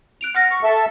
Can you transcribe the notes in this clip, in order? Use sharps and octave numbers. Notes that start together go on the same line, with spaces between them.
F#6 D7 F7
F#5 F6 A#6
C#6
A4 E5